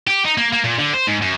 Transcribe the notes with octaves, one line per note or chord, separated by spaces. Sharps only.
G4
D#4
A#3
A#3
A#2
D3
C5
G#2
F#2